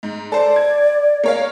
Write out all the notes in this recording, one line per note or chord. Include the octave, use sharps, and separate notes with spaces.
G#2
A4 C5 D5
G#6
A#3 C#5 F5